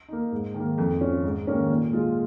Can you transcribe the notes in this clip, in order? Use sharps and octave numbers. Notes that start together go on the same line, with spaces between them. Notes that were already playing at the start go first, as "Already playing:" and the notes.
A#3 D#4
G#2
D#3 A#3
F2
F3 C#4
G#2
D#3 A#3 C#4
A#2
G#3 F4